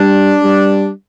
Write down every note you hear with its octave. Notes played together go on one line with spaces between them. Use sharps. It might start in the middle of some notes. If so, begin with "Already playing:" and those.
Already playing: G3 D4
G3